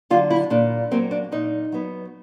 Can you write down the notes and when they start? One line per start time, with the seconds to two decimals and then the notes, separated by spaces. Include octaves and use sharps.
0.10 D3 F#3 F4
0.30 E4
0.50 A#2 D4
0.91 F#3 A#3 C4
1.11 D4
1.32 A#2 D#4
1.72 F#3 B3